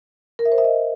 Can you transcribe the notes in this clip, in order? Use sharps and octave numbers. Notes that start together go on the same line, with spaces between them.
A#4
E5
C5
E5
D#5